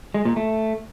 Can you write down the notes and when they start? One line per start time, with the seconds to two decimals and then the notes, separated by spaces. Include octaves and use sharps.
0.14 G#3
0.25 A#2
0.36 A3